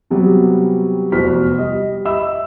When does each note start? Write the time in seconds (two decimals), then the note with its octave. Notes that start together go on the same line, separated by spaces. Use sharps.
0.10 C3 F#3 G3 B3
1.12 F1 B3 F#4 C5 F6 B6
1.58 G3 D#5
2.05 D#5 E5 B5 E6